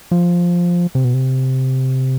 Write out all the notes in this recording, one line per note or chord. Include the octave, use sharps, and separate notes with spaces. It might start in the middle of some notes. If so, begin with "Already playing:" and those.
F3
C3
B2
C3